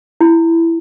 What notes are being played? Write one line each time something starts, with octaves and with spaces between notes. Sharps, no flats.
E4